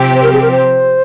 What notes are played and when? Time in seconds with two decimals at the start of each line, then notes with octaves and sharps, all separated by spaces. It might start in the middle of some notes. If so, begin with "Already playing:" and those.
Already playing: C3 F3 C4 G4
0.14 C5
0.23 A#4
0.32 G#4
0.42 A#4
0.51 C5